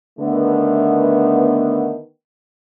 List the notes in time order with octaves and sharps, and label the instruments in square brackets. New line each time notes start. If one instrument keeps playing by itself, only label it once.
[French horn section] D3 D#3 A3 B3